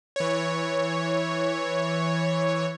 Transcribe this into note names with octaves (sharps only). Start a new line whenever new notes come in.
E3 C#5